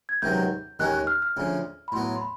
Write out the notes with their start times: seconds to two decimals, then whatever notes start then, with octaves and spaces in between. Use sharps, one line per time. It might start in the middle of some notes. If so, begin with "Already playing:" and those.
0.09 G#6
0.22 C#2 C3 D#3 F#3 G6
0.79 D#2 D#3 G#3 C#4 F#6
0.94 F#6
1.07 F6
1.22 F6
1.37 D2 C#3 F3
1.88 B5
1.92 A2 F#3 B3 C6
2.16 C6
2.21 B5